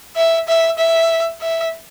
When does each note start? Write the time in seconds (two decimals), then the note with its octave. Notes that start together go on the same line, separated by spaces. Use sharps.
0.16 E5
0.48 E5
0.78 E5
1.41 E5